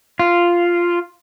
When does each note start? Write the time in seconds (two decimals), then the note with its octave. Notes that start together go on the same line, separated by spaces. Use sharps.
0.19 F4